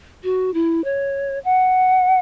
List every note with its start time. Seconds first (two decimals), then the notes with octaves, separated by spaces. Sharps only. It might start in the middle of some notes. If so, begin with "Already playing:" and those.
0.24 F#4
0.54 E4
0.84 C#5
1.45 F#5